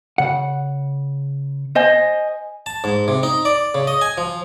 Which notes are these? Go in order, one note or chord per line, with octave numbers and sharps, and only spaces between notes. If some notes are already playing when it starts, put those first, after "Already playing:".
C#3 F#5
C5 D#5 G#5
A5
G#2
C3
D#4
D5
C#3
D#5
G#5
F3